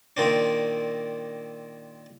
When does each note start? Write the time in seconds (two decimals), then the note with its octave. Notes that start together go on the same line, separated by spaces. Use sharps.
0.17 A#2 D#3 C4 D4